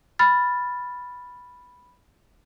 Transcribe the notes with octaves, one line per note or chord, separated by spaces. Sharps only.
B5 F6 A6